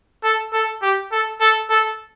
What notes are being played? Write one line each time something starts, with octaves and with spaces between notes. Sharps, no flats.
A4
A4
G4
A4
A4
A4